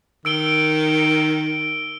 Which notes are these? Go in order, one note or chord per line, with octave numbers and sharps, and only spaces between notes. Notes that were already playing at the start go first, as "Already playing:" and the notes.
D#3 E6 D7 G7